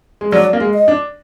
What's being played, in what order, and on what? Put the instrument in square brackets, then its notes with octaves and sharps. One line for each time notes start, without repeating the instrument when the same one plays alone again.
[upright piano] G#3
[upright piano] F#3 [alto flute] D5
[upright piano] A#3
G#3
[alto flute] D#5
[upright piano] D4